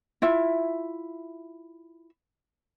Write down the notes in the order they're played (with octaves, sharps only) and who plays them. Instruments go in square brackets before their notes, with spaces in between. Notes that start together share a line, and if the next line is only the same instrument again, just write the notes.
[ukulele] E4 F4 E5